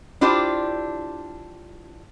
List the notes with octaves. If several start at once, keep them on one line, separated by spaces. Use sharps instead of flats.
D4 E4 F4 G4 C5 D5